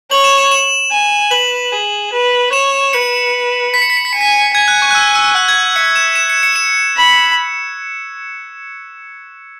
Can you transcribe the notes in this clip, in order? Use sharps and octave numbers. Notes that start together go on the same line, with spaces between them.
C#5 F#7
E7
E7
E7
G#5
B4 F#7
G#4
B4
C#5 E7
B4 C#7
B5 B6
C#7
B6
C#7
B6
G#5 C#7
B6
G#5 G#6
F#6
C#6
F#6
E6
E6
F#5 F#6
G#6
E5 C#7
E7
E7
C#7
C#7
E7
B5